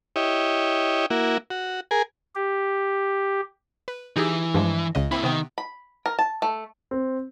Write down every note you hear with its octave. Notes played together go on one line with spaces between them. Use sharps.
E4 G4 C#5 D#5
A#3 E4 F#4
F#4
G#4 A#4 G#5
G4
B4
E3 D#4 G4 G#4
G2 F3 G#3
C#2 C#3 D#5
A#3 C4 E4 B5
C3 D#3 B3 G5
B5
A#4
A5
A3
C4